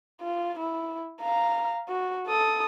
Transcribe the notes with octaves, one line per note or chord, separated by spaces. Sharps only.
F4
E4
F5 A#5
F#4
A4 D#6